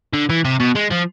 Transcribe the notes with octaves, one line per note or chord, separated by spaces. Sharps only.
D3
E3
C3
B2
G#3
F3